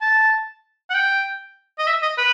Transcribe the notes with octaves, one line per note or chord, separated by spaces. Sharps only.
A5
F#5
G5
D#5
E5
D#5
B4